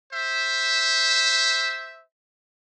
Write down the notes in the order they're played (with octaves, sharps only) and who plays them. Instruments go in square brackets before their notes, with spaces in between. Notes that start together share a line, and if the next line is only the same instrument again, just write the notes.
[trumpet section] C5 E5